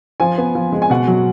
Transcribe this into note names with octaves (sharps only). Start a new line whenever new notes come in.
F3 G#5
B3
F3
G#3
G#5
B2 F#5
F#3